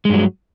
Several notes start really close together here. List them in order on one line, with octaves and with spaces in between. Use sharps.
G#3 G2 F#3